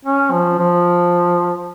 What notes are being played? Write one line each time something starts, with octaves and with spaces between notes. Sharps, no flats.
C#4
F3
F3